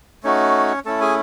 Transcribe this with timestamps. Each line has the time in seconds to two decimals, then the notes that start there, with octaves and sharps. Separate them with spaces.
0.23 A3 C#4 D#4 F#4 C#5
0.85 A3 C#4 E4 A4 A5
1.01 G#4 G#5